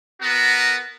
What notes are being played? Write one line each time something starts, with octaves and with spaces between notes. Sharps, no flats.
B3 F#4 A#4